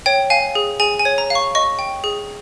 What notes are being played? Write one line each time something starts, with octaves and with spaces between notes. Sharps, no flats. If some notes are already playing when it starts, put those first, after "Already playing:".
C#5 G5
F5 G#5
G#4
G#4 G#5
G#5
C#5
A#5
F5 C#6
D#5 C#6
G5
G#4